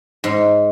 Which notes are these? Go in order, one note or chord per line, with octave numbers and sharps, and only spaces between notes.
G#2